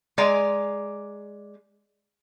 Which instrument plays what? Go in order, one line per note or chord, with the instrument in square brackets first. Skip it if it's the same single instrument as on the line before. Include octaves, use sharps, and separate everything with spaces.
[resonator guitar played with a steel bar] G#3 D5 G#5 A#5